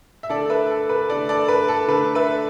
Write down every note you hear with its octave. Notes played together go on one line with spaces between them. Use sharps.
E5
D3 A3 A4 D5
B4 E5
A4
B4
D3 A3 A4 D5
A4 D5
B4
A4
D3 A3 B4
B4 E5